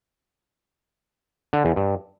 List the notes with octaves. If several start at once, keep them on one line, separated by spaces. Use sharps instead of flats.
D3
E2
G2